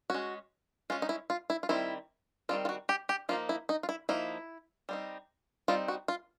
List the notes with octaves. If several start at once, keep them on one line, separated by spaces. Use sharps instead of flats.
G#3 C#4 F#4
G#3 C#4 F4
D#4
E4
F4
E4
F4
D#3 G3 C4 E4
D#3 G3 C4 F4
F4
F#4
G4
G4
F3 A#3 D#4 F4
E4
D#4
F4
E4
F3 A#3 D#4 E4
G3 C4 D#4
G3 C4 D#4 F4
F#4
F4